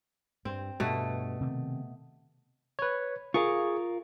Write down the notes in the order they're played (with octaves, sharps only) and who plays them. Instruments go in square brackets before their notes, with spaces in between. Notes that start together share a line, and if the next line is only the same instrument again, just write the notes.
[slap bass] G2 [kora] C4
[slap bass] G2 [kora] B2 A3
[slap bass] C3 D#3 C4
[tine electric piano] B4 C#5
[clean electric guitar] F4 A#4 F5 [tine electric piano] G#4 C#6